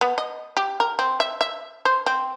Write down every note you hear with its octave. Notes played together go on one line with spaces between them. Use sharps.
B3
D#5
G4
A#4
C4
E5
E5
C5
C4